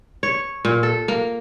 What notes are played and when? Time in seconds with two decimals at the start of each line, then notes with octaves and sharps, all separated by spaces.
0.23 C#5
0.65 A#2
0.83 A4
1.08 A#3